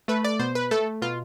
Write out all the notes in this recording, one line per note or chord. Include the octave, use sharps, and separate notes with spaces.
A3 B4
D5
B2 C5
B4
A3 A4
B2 F4